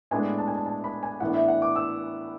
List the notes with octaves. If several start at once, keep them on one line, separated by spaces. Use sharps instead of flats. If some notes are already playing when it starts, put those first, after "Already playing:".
A2 G#3 B3 D4 G#5
A5
G#5
A5
A5
B5
G#5
A2 E3 B3 D4 F#5
E5
F#5
D6
E6